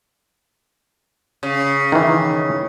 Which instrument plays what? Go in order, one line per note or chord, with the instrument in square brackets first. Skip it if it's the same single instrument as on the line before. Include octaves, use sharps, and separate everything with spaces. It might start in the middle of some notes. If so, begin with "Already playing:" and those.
[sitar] C#3
[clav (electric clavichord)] D#3 E3